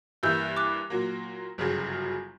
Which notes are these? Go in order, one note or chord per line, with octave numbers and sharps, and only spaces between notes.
G2 E3 G3 A#3 E4 E6 G6
D6 F#6
A#2 F#3 A#3
G1 F#2 C#3 F#3